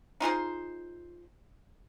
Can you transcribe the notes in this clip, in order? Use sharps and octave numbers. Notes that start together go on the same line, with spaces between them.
D#4 F4 G#4 C5